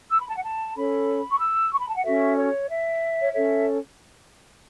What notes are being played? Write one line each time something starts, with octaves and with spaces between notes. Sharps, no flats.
E6
B5
A5
F#5
A5
C#4 A4 C#5 B5
C#6
E6
C#6
B5
A5
F#5
C#4 F#4 A4 E5
C#5
E5
C#5
C#4 A4 C#5 E5